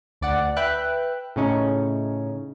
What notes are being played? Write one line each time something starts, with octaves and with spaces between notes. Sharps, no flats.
D2 D5 F#5
B4 E5 G5 F#6
A2 C#3 C#4 D#4